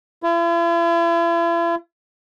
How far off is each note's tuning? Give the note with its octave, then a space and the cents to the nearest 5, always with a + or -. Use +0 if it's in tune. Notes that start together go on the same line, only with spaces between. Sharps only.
E4 +45